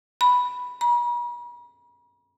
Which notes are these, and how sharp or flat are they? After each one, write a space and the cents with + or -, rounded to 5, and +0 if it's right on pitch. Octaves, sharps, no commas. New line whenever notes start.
B5 +0
B5 -45